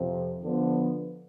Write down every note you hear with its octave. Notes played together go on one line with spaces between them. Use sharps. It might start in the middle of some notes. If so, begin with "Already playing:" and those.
Already playing: F2 C3 F3
D3 F3 B3